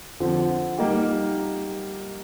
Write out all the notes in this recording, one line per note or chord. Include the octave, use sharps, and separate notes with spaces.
D3 F3 C4
G3 A#3 D#4 G4